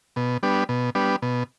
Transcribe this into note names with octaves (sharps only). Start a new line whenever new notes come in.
B2
G3 B3 D4
B2
G3 B3 D4
B2